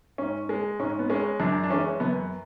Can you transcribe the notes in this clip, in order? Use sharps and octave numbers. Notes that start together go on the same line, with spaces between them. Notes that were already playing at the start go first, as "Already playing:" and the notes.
G#2 C#4
G#3
G#2 C#4
B3
G#3 C#4
F#2 D4
D4
E3 G#3 C#4
F#2 B3